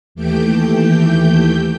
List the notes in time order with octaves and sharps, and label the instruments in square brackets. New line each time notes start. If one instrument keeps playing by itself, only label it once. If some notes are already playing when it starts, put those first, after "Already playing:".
[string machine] D#2 E3 A3 G4 G5 G6